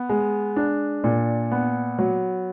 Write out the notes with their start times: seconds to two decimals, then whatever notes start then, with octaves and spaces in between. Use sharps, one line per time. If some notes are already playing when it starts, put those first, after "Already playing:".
Already playing: B3
0.09 G#3
0.56 D4
1.04 A#2
1.52 B3
1.99 F#3